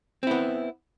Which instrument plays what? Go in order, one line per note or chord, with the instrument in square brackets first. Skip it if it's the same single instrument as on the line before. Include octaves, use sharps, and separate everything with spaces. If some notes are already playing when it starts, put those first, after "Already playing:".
[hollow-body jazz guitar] C4
E4
B3